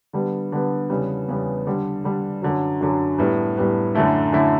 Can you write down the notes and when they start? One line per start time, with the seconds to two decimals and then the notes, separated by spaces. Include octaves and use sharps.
0.13 D3 G3 B3
0.52 D3 G3 B3
0.90 E2 C#3 G3 B3
1.28 E2 C#3 G3 B3
1.67 D3 G3 D4
2.04 D3 G3 D4
2.42 F#2 D3 F#3
2.81 F#2 D3 F#3
3.18 A2 G3 B3
3.57 A2 G3 B3
3.95 F#2 D3 A3 E4
4.33 F#2 D3 A3 E4